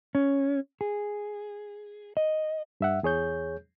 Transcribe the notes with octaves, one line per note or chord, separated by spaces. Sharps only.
C#4
G#4
D#5
G2 E5 F#5
E2 G#4 C#5 G6